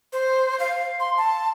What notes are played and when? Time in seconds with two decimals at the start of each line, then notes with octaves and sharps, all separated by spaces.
0.13 C5
0.60 F5
1.00 C6
1.17 A5